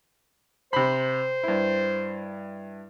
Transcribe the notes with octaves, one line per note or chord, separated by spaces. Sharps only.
C3 C5 B5
G2 E4